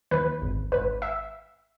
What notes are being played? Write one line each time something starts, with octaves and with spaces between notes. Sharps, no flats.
D#2 B4
G#1
G#1 B4
E5